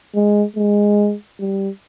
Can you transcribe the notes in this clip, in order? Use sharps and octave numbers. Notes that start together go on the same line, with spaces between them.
G#3
G#3
G3